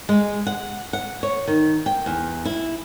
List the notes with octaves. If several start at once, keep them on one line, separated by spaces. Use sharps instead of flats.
G#3
F#5
F#5
C#5
D#3
G5
E2
E4